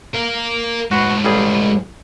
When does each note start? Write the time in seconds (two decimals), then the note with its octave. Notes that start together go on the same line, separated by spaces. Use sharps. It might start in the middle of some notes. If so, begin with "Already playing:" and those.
0.15 A#4 F5
0.91 A2 G#3 F#4 B4
1.25 A1 G3 G#4